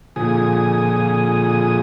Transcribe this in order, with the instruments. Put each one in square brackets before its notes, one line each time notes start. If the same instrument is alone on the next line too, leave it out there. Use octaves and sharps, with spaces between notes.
[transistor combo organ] A#2 D3 F3 G#4 G#5 D#6